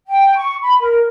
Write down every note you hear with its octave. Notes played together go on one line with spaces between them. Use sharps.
G5
C#6
B5
A#4